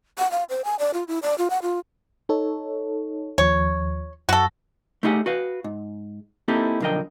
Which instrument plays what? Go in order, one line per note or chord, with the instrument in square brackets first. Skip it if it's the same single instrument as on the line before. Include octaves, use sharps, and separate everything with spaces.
[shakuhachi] F#5
F5
C5
G#5
D5
F4
E4
D5
F4
F#5
F4
[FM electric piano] D#4 A4 C#5
[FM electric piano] D#2 F3 [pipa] C#5
[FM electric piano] F#2 A#6 [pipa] F#4 A4
[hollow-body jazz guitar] A3 D#4 E4 G4 G#4 F#5
F#4 B4 F5
G#2
A#3 C4 D#4 E4 G4 A4
B1 F2 D3 A#4 D#5 G5